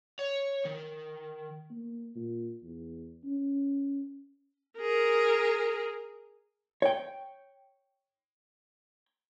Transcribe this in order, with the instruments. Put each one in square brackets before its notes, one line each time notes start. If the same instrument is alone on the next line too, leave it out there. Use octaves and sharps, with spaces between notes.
[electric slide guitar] C#5
D#3
[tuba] A#3
A#2
E2
C#4
[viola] G#4 A#4
[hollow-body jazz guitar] C#5 G5